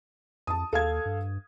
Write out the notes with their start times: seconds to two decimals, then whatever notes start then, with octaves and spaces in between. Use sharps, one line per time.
0.47 F2 A5 D#6
0.73 D#2 A4 F5 G#6
1.05 G2